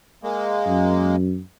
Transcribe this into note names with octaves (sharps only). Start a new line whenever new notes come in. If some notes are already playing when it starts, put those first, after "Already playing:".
G#3 A#3
F#2